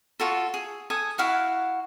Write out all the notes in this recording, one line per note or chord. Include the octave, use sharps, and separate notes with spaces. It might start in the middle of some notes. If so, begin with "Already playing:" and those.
F4 F#4 A4
G#4
A4 G#5 D#6
E4 F#4 F5 F#5